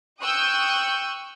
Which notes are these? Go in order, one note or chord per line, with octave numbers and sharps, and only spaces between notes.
G5 C#6 D#6 E6 F#6 G6